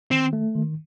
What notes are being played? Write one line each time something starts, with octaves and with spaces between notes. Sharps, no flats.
D#3 C4
A3
D#3